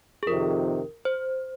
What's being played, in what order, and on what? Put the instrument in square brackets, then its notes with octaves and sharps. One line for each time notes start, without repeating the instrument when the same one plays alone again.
[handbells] G#4
[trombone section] F2 C3 D#3 [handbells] A#4
[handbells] C5